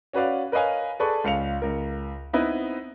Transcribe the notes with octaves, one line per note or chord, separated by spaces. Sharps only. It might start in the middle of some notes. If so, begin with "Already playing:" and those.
C#4 F#4 B4 D5 F5
A#4 B4 C#5 D#5 F5 G#5
G#4 A4 B4 D5 C#6
C#2 F5 C#7 F7
C#2 A#4
B3 C4 D#4 E4 B4